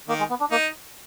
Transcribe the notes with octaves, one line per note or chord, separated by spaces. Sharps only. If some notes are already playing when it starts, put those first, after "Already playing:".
D#3 A#3
G#3
B3
D4
A#3 D#4